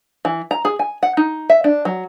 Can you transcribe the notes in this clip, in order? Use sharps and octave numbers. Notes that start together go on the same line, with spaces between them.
E3
A#5
G#4
G#5
F#5
D#4
E5
D4
F#3